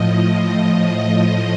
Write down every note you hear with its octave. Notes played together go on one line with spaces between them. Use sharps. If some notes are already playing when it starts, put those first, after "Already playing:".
Already playing: A2 F3 D#5